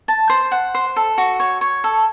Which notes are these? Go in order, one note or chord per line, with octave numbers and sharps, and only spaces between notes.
A5
C5
F#5
C5
A4
F#4
C#5
C#5
A4